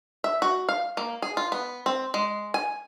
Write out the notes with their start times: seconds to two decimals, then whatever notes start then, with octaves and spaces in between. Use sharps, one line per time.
0.24 E5
0.42 F#4
0.69 F5
0.97 A#3
1.22 G#4
1.37 F4
1.52 B3
1.86 C4
2.14 G#3
2.54 G#5